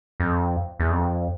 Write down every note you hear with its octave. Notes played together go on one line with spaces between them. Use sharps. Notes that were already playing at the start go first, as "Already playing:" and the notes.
F2
E2
F2